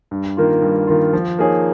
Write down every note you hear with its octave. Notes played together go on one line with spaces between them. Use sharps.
G2
D#3 A#3 F4
G2
D#3 A#3 F4
F3
A#3 D#4 G#4 C#5